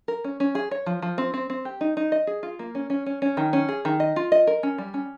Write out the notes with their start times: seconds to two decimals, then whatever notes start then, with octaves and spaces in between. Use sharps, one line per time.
0.08 A#4
0.24 C#4
0.40 C#4
0.55 G#4
0.71 C#5
0.86 F3
1.02 F3
1.18 C4
1.34 C4
1.50 C4
1.65 G4
1.81 D#4
1.97 D#4
2.12 D#5
2.27 G#4
2.43 F4
2.59 A#3
2.75 C#4
2.90 C#4
3.06 C#4
3.22 C#4
3.37 D#3
3.53 C#4
3.69 G#4
3.85 D#3
4.00 D#5
4.16 F4
4.32 D#5
4.47 A#4
4.63 C#4
4.78 G3
4.94 C#4